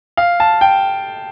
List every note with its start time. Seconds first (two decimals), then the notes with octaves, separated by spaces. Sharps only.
0.17 F5
0.40 A5
0.61 G5